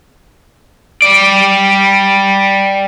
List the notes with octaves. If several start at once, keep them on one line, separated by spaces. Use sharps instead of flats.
G3 D5